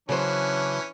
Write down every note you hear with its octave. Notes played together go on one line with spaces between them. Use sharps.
C#3 E3 F#3 C#4 D4 C5